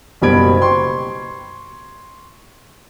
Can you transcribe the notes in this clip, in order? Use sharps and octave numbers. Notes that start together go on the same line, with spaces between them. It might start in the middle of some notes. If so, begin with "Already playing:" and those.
F#1 B2 G3 B5 G#6 D7
C6 C#6